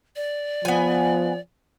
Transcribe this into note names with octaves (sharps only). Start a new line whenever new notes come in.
D5
F3 B3 G#5